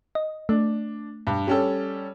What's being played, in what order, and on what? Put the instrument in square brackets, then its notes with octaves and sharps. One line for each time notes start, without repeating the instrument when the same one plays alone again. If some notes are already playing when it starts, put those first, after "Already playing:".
[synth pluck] D#5
[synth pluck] A3 [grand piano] D4
[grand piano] G2
G3 C#4 A4